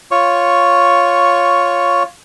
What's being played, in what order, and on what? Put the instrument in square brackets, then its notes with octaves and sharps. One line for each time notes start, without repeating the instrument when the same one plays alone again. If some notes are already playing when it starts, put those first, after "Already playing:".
[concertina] F4 C#5 C#6